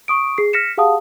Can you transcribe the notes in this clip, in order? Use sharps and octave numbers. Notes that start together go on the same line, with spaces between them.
C#6 D#6 D7
G#4 C7
F6 A#6 B6 C#7 E7
G4 G#4 F5 F#5 A5 D#6